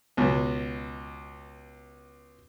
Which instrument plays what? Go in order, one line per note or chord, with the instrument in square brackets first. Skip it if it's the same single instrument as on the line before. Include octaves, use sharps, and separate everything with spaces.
[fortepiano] C#2 B2